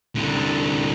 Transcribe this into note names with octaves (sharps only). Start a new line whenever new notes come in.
C2 D3